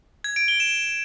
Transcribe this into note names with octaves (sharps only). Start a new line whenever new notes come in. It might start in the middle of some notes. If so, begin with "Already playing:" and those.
G#6
D7
G7
E7